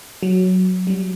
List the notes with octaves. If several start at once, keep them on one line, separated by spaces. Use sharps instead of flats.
F#3
G3
F#3